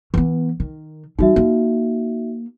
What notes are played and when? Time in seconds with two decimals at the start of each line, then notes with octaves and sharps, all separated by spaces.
0.14 E3 B3
0.60 D#3
1.19 E3 G3 D#4 F#4 E5
1.36 A#3